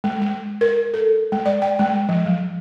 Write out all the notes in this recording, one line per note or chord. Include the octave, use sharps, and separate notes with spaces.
G#3
G#3
A#4
A4
G#3
D5
G5
G#3
F3
F#3